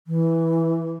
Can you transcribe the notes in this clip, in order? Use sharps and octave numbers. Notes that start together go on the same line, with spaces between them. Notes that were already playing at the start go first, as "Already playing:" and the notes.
E3